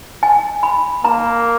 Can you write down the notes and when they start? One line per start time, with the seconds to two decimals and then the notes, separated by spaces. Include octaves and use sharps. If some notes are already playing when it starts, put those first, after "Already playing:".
0.23 G#5
0.63 B5
1.04 A#3 A#5